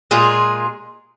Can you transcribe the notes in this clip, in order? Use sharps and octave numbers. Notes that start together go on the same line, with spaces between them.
A#2 G#3 F4 G#4